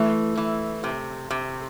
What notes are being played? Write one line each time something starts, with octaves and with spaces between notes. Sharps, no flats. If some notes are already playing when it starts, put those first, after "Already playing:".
Already playing: E3 A3
E3
C3
C3